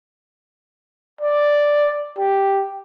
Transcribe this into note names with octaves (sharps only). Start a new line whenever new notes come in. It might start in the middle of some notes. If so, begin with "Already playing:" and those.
D5
G4